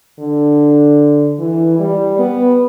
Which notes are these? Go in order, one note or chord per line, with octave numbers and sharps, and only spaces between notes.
D3
E3
G3
B3